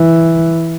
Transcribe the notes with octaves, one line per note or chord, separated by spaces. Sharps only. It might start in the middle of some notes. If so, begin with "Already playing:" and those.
Already playing: E3